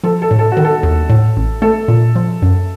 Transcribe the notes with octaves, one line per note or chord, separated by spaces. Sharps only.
F3 A4
A4
A2
A4
D#3 F#4
A4
D#2
A2
A1
A3 A4
A#2
F3
F#2